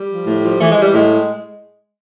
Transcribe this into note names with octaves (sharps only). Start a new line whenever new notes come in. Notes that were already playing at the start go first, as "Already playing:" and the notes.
Already playing: G3
F3
A2
F3
E3 A3
G#3
E3 G3
A2 G#3